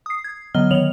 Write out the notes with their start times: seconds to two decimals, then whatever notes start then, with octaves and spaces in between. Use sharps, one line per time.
0.06 D#6 C7
0.24 G#6
0.54 D3 F#3 B3 D#5 F6 G7
0.71 D#3 B3 C#5 F7 F#7